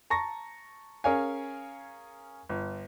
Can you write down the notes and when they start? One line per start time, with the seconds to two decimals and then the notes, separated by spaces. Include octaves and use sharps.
0.10 A5 A#5 C#6 A#6
1.04 C#4 G#4 A#4 C#5 F5 G#5
2.49 G1